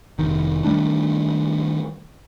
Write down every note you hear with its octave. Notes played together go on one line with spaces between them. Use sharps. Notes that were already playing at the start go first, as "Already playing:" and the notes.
F1 B1 D#3
D#3 G3 A3 D4